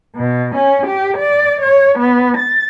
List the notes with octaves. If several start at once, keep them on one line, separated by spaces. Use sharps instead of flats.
B2
C#4
G4
D5
C#5
B3
A6